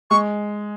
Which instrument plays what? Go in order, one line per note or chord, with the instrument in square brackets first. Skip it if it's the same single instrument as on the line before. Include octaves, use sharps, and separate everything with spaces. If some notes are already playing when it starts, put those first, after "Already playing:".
[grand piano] G#3 [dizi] C#6